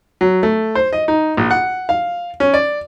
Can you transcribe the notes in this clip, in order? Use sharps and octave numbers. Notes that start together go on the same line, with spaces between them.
F#3
A3
C5
D#5
D#4
A#1
F#5
F5
C#4
D5